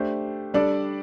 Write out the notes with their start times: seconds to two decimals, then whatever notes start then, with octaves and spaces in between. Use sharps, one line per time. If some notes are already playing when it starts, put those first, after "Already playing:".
Already playing: A3 D4 G4 C5
0.54 G3 D4 A4 D5